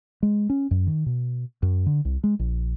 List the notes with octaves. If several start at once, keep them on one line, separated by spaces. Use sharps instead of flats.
G#3
C#4
F#2
D#3
B2
F#2
D3
C2
G#3
A#1